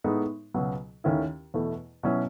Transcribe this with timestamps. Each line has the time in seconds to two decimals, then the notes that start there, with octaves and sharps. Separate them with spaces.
0.04 A2 G#3 B3 D#4
0.54 C#2 B2 F#3 B3
1.04 D#2 D#3 A3 C#4 E4
1.54 E2 B2 A3 E4
2.03 B2 F#3 C#4 E4